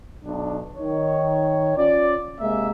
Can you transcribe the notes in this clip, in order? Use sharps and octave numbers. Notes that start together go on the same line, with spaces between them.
B1 D4
D#3 C#5
C#4 F4 D5
C3 G#3 A#3 E5